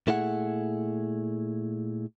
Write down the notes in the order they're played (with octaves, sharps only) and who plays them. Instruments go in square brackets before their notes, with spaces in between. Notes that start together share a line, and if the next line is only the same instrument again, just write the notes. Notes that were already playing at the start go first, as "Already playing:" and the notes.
[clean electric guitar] A#2 A3 E4 G#4 B4 F#5